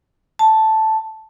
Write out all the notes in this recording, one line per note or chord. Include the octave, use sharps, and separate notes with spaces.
A5